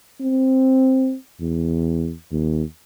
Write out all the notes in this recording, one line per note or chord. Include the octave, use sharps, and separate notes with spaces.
C4
E2
D#2